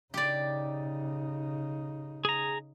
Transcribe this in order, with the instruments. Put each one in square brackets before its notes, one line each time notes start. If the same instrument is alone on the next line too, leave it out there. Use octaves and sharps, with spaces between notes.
[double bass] C#3 D#4 [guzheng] G4 D5
[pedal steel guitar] G#4 A#5